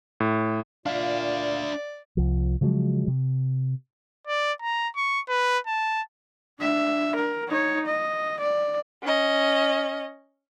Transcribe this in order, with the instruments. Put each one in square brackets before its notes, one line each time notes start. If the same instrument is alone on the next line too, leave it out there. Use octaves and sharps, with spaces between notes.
[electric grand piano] A2
[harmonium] A#2 [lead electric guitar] D4 E5 [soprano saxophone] D5 [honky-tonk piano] F5
[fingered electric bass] C2 F3
C#3 F3 F#3 G#3
C3
[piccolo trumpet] D5
A#5
C#6
B4
A5
[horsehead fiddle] D4 E5
A#4
D#4 C#5
D#5
D5
[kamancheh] C#4 D#5